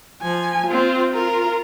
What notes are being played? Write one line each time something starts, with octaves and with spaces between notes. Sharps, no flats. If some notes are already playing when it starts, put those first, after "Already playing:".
F3 G#5
C4 F4
F4 A#4